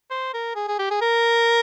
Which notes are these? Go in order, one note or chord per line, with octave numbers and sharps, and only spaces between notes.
C5
A#4
G#4
G#4
G4
G#4
A#4